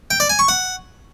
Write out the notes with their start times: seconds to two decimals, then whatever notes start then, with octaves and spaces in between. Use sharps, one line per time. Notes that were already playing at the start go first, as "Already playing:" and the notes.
0.11 G5
0.20 D5
0.29 G#5
0.39 C#6
0.48 F#5